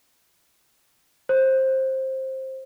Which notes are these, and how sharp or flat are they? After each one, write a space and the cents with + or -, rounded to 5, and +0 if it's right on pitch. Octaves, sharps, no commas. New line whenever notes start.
C5 +15